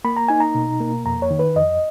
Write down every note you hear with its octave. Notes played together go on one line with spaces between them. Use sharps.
A#3 B5
A#5
D#4 G#5
A#5
B2
A#3
F2 A#5
C#5
D#3
B4
F2 D#5